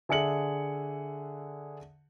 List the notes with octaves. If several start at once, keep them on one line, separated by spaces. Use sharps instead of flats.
D3 G#4 E5 C#7 F#7